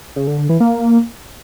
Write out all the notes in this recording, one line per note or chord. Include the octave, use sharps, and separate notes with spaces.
C#3
D3
D3
E3
A#3